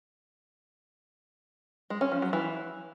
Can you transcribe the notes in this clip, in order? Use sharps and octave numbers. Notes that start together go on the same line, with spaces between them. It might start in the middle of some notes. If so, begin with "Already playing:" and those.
G#3
C#4
F3
F#3
E3